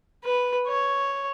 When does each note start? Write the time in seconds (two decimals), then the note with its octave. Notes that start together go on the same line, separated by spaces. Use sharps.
0.25 B4
0.67 C#5